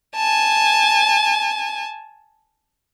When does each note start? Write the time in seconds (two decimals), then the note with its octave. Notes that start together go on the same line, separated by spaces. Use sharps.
0.16 G#5 A5